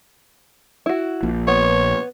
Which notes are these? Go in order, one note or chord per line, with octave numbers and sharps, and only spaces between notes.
E4 F#4
A#1 A#2
B3 C#5